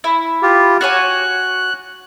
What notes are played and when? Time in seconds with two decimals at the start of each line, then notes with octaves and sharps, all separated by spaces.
0.04 E4
0.42 F4 G4
0.81 F#4 C#5 G#5 F#6